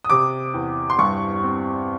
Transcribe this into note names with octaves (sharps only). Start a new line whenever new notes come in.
D#6
C3 D6
E2
C6
G2 C#6
C4